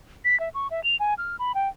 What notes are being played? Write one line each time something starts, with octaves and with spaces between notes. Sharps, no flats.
B6
E5
C#6
E5
F7
G#5
F6
B5
G5